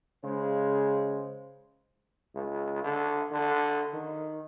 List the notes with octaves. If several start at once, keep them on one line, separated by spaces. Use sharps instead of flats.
C#3 G#3 C5
C#2
D3
D3
D#3